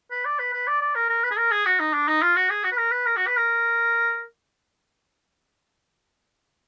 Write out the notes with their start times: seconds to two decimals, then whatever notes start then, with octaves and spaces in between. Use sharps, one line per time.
0.11 B4
0.25 D5
0.39 B4
0.53 B4
0.68 D5
0.82 D5
0.96 A#4
1.10 A#4
1.24 B4
1.31 G#4
1.37 A#4
1.52 G#4
1.66 F#4
1.80 D#4
1.94 D4
2.08 D#4
2.22 F4
2.36 F#4
2.50 G#4
2.64 F#4
2.72 B4
2.78 A#4
2.92 B4
3.06 A#4
3.17 F#4
3.27 B4
3.37 A#4